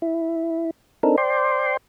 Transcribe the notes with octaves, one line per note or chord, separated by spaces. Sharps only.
E4
C4 D4 D#4 A4 A#4
C5 D5 G5 C6